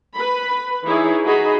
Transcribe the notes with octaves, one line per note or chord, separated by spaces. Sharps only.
B4 B5
E3 D#4 E4 G#4 C#5
D#4 F#4 G#4 D#5 B5